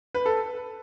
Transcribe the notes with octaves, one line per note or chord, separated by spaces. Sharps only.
B4
A4